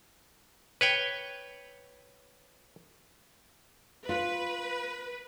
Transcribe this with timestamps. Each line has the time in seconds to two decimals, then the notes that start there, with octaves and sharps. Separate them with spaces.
0.81 B4 C#5 G5
4.09 F4 B4